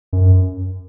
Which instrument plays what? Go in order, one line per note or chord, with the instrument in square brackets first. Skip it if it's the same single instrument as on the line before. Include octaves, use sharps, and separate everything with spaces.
[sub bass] F#2